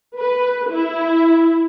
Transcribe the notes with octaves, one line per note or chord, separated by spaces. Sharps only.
B4
E4